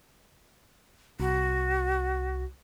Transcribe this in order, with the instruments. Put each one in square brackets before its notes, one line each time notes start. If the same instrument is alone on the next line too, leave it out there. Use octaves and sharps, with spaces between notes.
[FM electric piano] C2 [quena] F#4